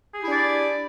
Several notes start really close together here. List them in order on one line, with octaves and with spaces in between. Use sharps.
G#4 G4 E4 D4 D5